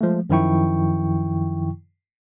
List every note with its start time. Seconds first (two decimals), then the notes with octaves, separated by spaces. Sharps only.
0.01 F3 G#3 A3
0.30 F#2 D#3 F3 E4 G5 C#6